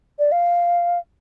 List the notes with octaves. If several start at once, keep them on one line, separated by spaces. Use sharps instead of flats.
D5
F5